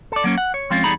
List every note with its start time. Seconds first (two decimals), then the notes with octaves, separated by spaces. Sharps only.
0.12 A4 D5
0.24 F#3 A#3 C#4
0.38 F#5
0.54 C#5
0.70 F3 G#3 C4 C#4 F4
0.84 E2 G3 D#4 G#4 A#5 B5